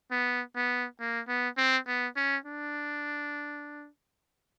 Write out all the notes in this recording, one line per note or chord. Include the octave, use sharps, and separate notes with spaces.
B3
B3
A#3
B3
C4
B3
C#4
D4